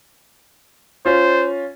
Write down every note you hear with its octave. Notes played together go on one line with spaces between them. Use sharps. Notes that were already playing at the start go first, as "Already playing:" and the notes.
C#4 F4 C5